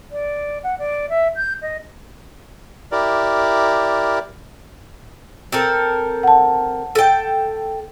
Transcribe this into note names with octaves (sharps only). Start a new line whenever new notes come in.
D5
F#5
D5
E5
G6
D#5
E4 G4 A#4 D5
C4 A4 A#4
F#5 A5
A4 G5